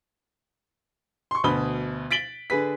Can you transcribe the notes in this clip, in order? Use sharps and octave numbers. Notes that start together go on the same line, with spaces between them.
C6 C#6
D2 B2 B5 D#6 G7
A6 B6 D7 F#7 G7
D3 G#4 B4 B6